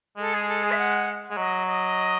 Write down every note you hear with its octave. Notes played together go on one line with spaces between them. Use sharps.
G#3 A4
G#4
A4
G#4
E5
F#5
G#3
F#3 D#5
D#5